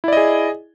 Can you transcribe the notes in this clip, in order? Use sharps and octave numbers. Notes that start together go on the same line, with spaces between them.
E4 G#4 D5 D#5